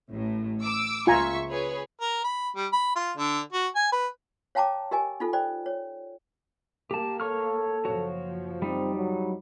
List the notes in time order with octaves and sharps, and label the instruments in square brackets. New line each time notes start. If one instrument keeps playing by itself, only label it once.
[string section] A1 A2
D6 E6
[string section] C#2 E5 C#6 [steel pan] F4 G#5 A#5
[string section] G#4 B4 C#5
[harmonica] A#4
B5
G3
B5
F4
D3
F#4
G#5
B4
[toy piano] C#5 F5 G5 A5 A#5 D6
G4 A#4 D#5 G#5
D#4 F4 A4
C5 D5 G5
C#5
[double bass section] A#3 [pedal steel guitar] G4 A5
[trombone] A4 [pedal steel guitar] C#5 C#6 F6
[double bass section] F#1 F3 [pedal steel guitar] F#4 C#5
[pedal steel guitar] G3 D#4 [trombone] C4
[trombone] F#3